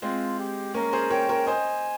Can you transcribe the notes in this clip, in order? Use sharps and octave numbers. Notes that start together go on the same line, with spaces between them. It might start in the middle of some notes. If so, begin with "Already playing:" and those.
G#3 C4 F4
G4
A#3 C#4 A#4
G#4 C5
A#4 C#5 G5
A#4 C#5
C5 D#5 G#5